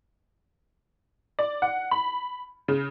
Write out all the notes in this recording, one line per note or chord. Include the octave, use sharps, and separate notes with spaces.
D5
F#5
B5
C#3